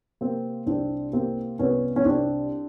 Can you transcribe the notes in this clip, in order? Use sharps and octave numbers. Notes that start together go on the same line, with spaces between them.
C3 A#3 C4
C2 C4 D4
C3 A#3 C4
C2 B3 C#4
C#4
C2 C4 D4